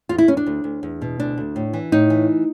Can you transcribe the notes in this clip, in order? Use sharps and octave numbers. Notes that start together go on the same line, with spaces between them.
E2 F4
E4
E2 C#4
D4
D2
D2
E2
B2
D2 D4
D2
A2
E3
A2 D#4
E3